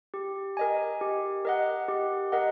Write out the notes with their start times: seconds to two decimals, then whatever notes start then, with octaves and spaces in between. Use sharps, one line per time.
0.14 G4
0.57 A#4 D#5 G#5
1.01 G4
1.45 A#4 D#5 F#5
1.88 G4
2.32 A#4 D#5 F#5